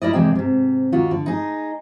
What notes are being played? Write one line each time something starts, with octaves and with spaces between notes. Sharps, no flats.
E4 A#4 D5 D#5
E2 C3 G#3 G#4 G5
G#2 C3
D#2 F4 F#4
D3
D#4 G#4